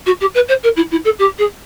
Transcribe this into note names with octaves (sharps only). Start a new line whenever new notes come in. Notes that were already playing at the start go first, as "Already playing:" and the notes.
F#4
G4
B4
C5
A#4
E4
E4
A4
G4
G#4